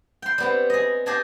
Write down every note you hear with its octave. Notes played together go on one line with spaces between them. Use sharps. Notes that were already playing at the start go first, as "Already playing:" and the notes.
G5 C6
G3 B3 C4
G#4 D#5
G4 G#4 D5 D#5 G#5 A5